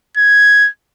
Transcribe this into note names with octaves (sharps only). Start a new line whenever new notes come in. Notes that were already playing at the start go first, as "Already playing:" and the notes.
G#6